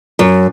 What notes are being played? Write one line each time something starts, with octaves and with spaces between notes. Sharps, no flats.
F#2